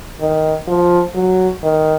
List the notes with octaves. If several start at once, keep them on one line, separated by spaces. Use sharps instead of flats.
D#3
F3
F#3
D#3